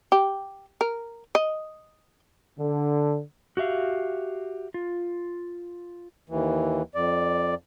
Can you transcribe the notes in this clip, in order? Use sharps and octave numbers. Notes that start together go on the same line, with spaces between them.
G4
A#4
D#5
D3
F#4 G4 E5 F5
F4
D#2 E3
F2 D5